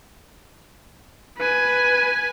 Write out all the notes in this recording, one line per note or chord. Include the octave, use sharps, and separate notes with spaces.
B4 G#5